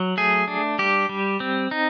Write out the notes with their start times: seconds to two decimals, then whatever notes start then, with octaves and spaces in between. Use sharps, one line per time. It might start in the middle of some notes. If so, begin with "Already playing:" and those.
Already playing: F#3
0.17 A3 G#4
0.48 D4
0.79 G3 G4
1.09 G3
1.40 C4
1.71 D#4